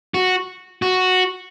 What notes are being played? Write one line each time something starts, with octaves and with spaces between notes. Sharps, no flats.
F#4
F#4